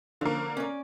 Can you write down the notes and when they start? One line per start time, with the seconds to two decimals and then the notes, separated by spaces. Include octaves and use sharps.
0.21 D3 F3 A#3 C#4 F4
0.57 C#4 D5